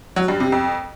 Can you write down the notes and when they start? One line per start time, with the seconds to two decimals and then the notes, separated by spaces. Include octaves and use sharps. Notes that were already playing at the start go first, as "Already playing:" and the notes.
0.16 F#3
0.28 G2
0.40 C3
0.52 F2